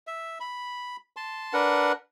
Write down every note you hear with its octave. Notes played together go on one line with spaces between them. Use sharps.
E5
B5
A5 C6
D4 A#4 B4 F#5